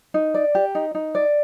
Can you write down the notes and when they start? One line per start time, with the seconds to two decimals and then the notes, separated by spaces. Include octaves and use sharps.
0.14 D#4
0.34 D5
0.55 G4
0.75 D#4
0.95 D#4
1.15 D5